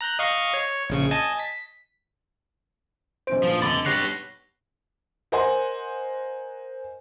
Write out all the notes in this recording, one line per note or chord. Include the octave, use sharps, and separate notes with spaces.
A#5 F#6 G6
D#5 F5 C#6
C#5
A#1 C#3 C#6
D#5 G#5 A5
B6
B1 C#4 C5 D7
G2 A#2 F3
F1 D3 B5 D6 A6
G2 G3 B3 C#5 F#6 A#6 C7
A#4 C5 D#5 F#5 G#5 C6